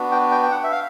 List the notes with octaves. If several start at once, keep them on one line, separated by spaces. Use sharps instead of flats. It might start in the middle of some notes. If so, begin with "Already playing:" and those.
Already playing: B3 D4 F#4
G5
G5
G5
F#5
E5
F5